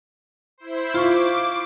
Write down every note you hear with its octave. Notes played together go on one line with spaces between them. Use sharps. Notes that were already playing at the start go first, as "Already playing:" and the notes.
E4 C5
F4 C#6 D6